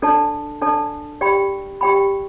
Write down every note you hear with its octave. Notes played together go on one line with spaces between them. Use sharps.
D4 A4 D5 A5
D4 A4 D5 A5
G4 D5 G5 B5
G4 D5 G5 B5